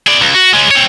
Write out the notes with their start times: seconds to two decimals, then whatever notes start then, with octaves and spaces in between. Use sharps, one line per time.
0.07 G#4 D5
0.21 C#2
0.34 F#4
0.53 G#3 C#4
0.71 C4 C#5